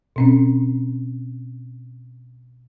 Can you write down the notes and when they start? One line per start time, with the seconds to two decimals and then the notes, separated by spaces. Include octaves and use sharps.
0.16 B2 C4 C#4